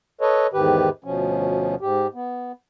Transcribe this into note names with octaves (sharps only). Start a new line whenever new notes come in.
A4 B4 C#5 D#5
E2 G#2 D#3 G4 B4
D2 B2 F3 C#4
G#2 G4
B3